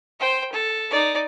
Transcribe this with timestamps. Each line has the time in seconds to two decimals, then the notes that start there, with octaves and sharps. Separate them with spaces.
0.20 C5 G5
0.52 A4
0.91 D#4 D5